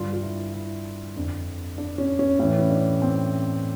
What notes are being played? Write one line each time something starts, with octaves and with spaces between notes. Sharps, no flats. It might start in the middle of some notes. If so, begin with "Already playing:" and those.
Already playing: G2 D3 F4
F4
E4
E4
F2 D3
D4
C#4
C#4
A2 E3 C#4
C#4
D4
C4